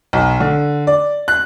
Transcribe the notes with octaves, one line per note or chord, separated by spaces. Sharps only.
B1
D3
D5
F#6